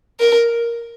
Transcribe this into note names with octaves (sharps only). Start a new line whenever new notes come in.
A#4